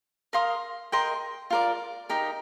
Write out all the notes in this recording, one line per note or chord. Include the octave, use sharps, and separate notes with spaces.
A#4 F5 C6 D#6
A#4 D#5 G5 C6
F4 A#4 D5
D#4 G4 A#4 D#5